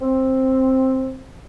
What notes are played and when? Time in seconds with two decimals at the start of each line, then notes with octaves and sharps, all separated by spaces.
0.02 C4